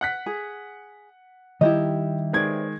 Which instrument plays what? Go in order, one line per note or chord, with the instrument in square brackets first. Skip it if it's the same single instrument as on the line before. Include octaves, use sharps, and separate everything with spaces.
[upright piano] F#5 F#6 B6
[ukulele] G#4
[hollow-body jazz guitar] D#3 G3 [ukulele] E4 G4 D#5
[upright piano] D#3 G#3 G#6 [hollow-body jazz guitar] B4 C5 D5